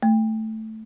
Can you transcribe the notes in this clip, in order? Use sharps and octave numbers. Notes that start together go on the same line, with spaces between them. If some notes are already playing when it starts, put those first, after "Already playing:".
A3